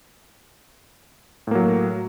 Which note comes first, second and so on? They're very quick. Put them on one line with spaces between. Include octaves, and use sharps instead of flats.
A2 A#3 F#3